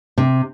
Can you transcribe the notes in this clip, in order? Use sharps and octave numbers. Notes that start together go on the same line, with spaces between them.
C3